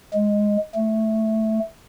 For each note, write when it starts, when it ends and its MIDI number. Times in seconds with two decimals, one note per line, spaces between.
0.14 0.57 56
0.75 1.59 57